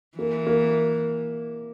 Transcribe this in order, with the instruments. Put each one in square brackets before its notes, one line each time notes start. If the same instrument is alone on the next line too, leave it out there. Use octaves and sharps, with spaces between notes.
[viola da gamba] E3 [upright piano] A#3
[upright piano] A#3